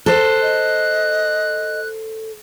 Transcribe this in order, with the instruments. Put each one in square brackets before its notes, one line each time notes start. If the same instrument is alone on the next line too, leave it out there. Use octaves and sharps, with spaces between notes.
[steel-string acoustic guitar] A4 C5 [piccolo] F#6
[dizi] D#5